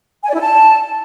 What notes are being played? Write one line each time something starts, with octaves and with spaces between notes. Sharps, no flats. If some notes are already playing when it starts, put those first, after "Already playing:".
G#5
D5
E4
A5